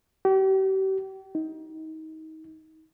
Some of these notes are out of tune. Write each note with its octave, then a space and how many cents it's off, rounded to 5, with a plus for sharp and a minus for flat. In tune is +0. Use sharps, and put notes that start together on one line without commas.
G4 -40
D#4 +30